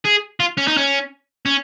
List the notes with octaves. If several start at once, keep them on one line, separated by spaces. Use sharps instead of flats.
G#4
F4
C#4
D#4
C#4
C#4